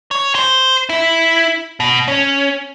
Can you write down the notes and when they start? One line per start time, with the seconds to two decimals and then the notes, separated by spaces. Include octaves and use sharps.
0.11 C#5
0.35 C5
0.89 E4
1.80 B2
2.08 C#4